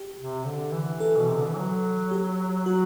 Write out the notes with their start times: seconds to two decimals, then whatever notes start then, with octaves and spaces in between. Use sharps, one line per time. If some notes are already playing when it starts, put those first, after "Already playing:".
Already playing: G4
0.18 C3
0.45 D3
0.73 E3
1.00 A4
1.17 B2
1.27 C3
1.37 D3
1.45 E3
1.56 F#3
2.11 G4
2.66 F#3 F#4